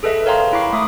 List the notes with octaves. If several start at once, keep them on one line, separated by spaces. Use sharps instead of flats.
G#4 A4 B4 D#5 E5
A#4 C#5 F5 G5 A#5 C6
E4 B5 C#6 D6 C7
A3 E5 D6 D#6